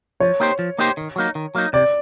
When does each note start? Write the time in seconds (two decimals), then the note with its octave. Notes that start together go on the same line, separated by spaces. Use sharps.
0.20 F3 C#5
0.40 A#3 D#4 G4 C5
0.59 F3
0.79 A#3 D#4 G4 C5
0.97 D#3
1.16 F#3 A#3 D#4
1.35 D#3
1.55 F#3 A#3 D#4
1.73 C3 D5